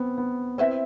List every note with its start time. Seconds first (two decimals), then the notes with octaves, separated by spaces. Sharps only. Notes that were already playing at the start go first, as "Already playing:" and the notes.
Already playing: B3 C4
0.18 B3
0.58 C4 E4 B4 E5